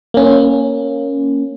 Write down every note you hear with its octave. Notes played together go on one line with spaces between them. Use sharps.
A#3 C#4